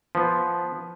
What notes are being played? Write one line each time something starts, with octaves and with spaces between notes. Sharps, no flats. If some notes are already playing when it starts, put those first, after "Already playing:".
F3 B3